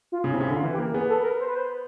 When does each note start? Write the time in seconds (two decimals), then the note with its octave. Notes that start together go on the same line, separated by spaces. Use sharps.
0.12 F4
0.24 C#3
0.32 C3 E4
0.41 C#3
0.48 D3
0.54 F4
0.63 E3
0.73 G4
0.78 A#3
0.94 B3 G#4
1.09 A4
1.20 B4
1.24 A#4
1.40 C5
1.48 B4
1.55 C5